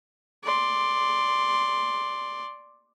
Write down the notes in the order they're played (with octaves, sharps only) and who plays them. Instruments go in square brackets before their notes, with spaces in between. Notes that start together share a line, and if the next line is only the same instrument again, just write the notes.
[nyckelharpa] D5 C6